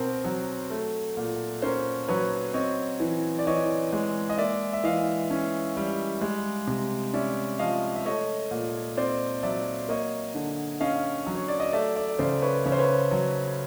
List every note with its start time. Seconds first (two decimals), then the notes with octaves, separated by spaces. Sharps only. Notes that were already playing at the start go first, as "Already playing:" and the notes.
Already playing: B2 C4 A#4 C5
0.24 F#3
0.70 A3
1.17 A#2
1.62 C#4 A#4 C5
2.08 F#3 B4 C#5
2.54 C4 C#5 D#5
3.00 E3
3.39 D5
3.47 E3 C#5 D#5
3.93 G#3
4.29 D#5
4.38 A#3 D5 E5
4.73 E5
4.84 E3 D#5 F5
5.31 C#4
5.77 G3
6.21 G#3
6.67 C3
7.14 C#4 D5 E5
7.59 F3 D#5 F5
7.95 E5
8.05 A3 C#5 D#5
8.51 A#2
8.97 C4 C5 D5
9.43 F#3 D5 E5
9.89 A#3 C#5 D#5
10.35 D3
10.81 C#4 D#5 F5
11.26 F#3
11.35 C#5
11.48 D5
11.60 D#5
11.73 A3 D5 E5
11.96 D5 E5
12.19 C#3 C5 D5
12.42 B4 C#5
12.64 C#3 C#5
12.72 C5
12.79 B4 C#5
13.11 F#3